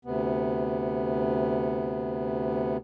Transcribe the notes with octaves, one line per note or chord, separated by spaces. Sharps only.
D2 C3 B3